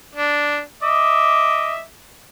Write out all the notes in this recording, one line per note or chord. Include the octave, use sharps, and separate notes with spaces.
D4
D#5 E5 D6